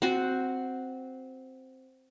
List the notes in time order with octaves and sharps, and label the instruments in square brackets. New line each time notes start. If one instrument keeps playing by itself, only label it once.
[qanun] C4 F#4